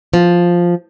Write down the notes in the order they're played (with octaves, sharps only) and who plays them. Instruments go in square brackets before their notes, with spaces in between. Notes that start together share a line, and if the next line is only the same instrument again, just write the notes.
[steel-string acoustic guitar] F3